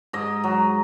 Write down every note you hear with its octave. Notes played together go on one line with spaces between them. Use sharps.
G#2 D#5
F#3